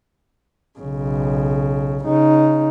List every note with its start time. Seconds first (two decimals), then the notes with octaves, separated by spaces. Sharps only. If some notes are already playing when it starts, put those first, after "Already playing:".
0.79 B1 C#3
2.04 C#3 D#4